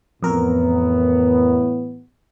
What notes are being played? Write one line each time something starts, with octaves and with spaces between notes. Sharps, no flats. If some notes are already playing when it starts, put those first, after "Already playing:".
F2 A2 E3 B3 A#4